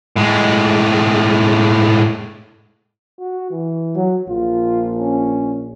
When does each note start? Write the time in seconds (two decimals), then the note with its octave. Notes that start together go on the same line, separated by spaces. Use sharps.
0.16 A2 G#3
3.19 F#4
3.50 E3
3.95 F#3
4.28 A#1 F4
4.97 C#4